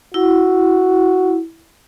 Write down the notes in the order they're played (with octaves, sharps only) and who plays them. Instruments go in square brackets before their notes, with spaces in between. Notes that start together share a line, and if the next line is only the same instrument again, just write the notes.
[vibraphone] E4 [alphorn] F#4